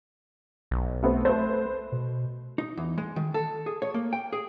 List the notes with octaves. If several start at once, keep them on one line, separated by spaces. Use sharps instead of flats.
B1
A3 B3 C4
A3 B4 C5
B2
D#4
E2
G#3
D#3
A4
G#4
C#5
A#3
G5
G#4